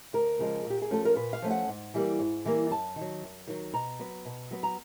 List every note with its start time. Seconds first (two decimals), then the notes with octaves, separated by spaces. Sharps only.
0.13 D2 A#4
0.39 C#3 F3 G#3
0.65 A#2
0.70 G4
0.82 G#4
0.91 F3 A3 C#4 A4
1.05 A#4
1.16 A#2 B4
1.33 F5
1.42 F3 A3 C#4
1.51 F#5
1.68 G#2
1.94 E3 G3 A#3
2.19 G#2
2.45 E3 G3 A#3
2.70 F#2 A5
2.96 D#3
3.01 F#3
3.22 F#2
3.47 D#3 F#3
3.73 B2 A#5
3.99 F#3 B3
4.25 B2
4.51 F#3 B3
4.63 A#5